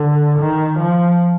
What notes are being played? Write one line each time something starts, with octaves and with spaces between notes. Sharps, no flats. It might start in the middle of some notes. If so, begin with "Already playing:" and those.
Already playing: D3
D#3
F3